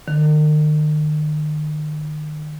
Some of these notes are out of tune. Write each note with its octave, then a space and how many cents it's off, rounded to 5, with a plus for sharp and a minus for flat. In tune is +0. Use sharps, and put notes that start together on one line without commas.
D#3 -40